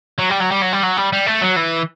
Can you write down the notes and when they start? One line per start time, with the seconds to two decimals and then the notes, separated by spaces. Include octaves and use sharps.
0.19 F#3
0.30 G3
0.41 F#3
0.52 G3
0.62 F#3
0.73 G3
0.84 F#3
0.97 G3
1.13 G3
1.26 A3
1.42 F#3
1.56 E3